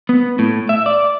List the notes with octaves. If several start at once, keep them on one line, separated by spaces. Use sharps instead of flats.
B3
A2
E5
D5